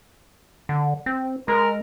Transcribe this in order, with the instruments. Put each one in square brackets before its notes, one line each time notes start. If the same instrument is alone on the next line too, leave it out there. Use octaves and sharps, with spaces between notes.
[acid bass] D3
C4
[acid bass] G#3 [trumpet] A#4